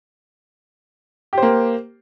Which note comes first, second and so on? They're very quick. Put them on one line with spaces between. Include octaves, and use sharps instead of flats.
G4 C5 A#3